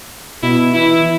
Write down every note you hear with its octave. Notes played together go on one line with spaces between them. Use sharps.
B2 E4
E3 E4